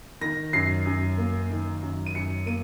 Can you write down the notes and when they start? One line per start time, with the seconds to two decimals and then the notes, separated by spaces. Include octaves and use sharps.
0.21 D#3 A#6
0.53 F#2 C7
0.86 F#2
1.18 A#3
1.50 D#3
1.82 F#2
2.06 D#7
2.15 F#2 C#7
2.46 A#3 D#7